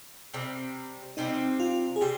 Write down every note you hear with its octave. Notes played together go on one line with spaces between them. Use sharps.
C3 G3 C4
C3 G3 C4 D#4
F4
G#4
C3 G3 C4 G4